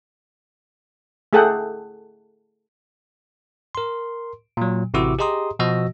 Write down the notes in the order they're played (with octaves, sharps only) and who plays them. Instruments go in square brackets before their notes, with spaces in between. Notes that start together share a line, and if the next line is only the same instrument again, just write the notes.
[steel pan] A3 G#4 A4 F#5 G5
[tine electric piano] A#4 C6
A#2 F#3
A1 C3 E4 F#4 D6 E6
G4 G#4 D#5 A#5 C6 D#6
B2 F3 F#4 D#5 E6 A#6